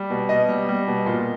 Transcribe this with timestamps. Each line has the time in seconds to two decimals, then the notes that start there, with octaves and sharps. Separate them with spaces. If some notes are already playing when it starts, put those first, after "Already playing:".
Already playing: G3
0.10 B2
0.29 B2 D#5
0.49 G3
0.69 G3
0.88 B2
1.06 A#2